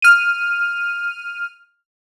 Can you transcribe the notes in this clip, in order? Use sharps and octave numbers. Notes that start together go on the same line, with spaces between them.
F6 D#7